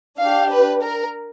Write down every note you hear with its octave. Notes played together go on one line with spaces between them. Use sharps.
D4 G4 F5
B4
A#4